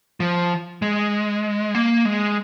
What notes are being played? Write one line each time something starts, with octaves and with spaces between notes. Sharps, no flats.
F3
G#3
A#3
G#3